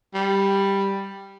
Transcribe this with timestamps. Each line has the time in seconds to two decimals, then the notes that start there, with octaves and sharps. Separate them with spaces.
0.14 G3